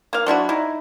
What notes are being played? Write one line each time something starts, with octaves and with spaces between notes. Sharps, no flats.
A#3 F5
F#3 D4 E4 F#4
D#4 E4